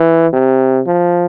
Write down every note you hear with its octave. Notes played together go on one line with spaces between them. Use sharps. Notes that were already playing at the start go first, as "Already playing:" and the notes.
Already playing: E3
C3
F3